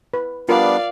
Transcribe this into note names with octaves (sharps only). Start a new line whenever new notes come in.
B4
G3 B3 D4 F4 A#4 D5 F5